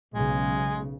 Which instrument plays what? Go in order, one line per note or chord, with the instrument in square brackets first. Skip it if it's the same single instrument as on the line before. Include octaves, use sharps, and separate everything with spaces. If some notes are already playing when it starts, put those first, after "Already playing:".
[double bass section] B1 C#3 [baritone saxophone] G#3